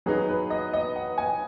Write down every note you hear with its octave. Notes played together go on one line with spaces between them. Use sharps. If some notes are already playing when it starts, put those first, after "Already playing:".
F#3 B3 D#4 G#4
B4
D#5
D#5
F#5
G#5